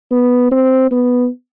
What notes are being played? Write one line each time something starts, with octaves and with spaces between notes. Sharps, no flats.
B3
C4
B3